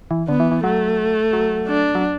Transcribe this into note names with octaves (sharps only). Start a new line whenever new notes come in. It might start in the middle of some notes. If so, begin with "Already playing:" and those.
E3
D3 B3
E3
E3
F#3 A3
F#3
D4
F#3